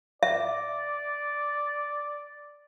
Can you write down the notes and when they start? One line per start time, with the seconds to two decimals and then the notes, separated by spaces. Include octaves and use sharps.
0.23 D5 E5